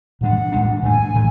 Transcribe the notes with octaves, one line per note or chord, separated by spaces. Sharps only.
A2 E3 G#3 D4 F#5
A2 E3 G#3 D4
A2 E3 A3 D4 G#5
A2 E3 A3